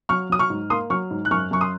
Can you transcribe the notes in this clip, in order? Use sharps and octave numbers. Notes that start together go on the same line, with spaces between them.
F#3 C#6 F6
F#3 D#6
C#6 F6
G#2
A#3 C6 D#6
F#3 C#6 F6
G#2
F#6
F#2 C#6 F6
F#2 C#6
C6 D#6